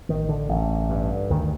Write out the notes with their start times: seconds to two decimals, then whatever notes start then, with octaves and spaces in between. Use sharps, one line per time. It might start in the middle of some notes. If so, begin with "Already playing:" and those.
0.09 A1 D#3
0.29 D3
0.49 A1
0.90 G2
1.30 D2 D#3